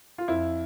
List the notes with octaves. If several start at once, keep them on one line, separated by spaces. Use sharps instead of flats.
F4
F2 E4